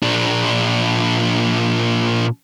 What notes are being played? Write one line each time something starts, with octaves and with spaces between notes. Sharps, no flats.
A#2 D4